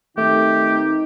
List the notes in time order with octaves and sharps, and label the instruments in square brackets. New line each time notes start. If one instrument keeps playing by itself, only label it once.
[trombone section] D#3 C4 D#4 [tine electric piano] A3 [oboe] G4